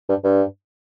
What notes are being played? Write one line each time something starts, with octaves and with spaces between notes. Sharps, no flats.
G2
G2